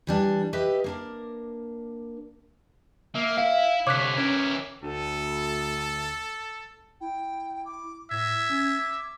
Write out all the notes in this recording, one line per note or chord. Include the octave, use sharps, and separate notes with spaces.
E3 G3 D4
G4 B4 D#5 E5
A#3 D4 A#4
A#3 E5
E4 F5
C2 D3 C#5 D6 F#6 B6
E3 C#4 A#4
D2 A4
E4 G5
D6
A2 E5 G#6
C#4
D6